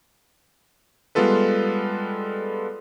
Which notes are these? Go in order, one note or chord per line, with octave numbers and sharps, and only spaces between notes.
G3 G#3 B3 F4 A4 B4